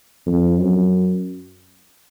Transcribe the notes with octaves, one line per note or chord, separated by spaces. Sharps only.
F2
F#2